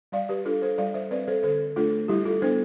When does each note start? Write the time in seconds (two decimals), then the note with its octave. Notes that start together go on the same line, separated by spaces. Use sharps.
0.12 G3 D5 F5
0.29 G4 B4
0.45 D4 F4 A4
0.62 A4 C5
0.78 G3 D5 F5
0.94 C5 E5
1.11 C4 B4 D5
1.28 A4 C5
1.43 D3 A4 C5
1.76 A3 D4 F4 A4
2.08 G3 E4 G4
2.25 F4 A4
2.42 B3 D4 A4 C5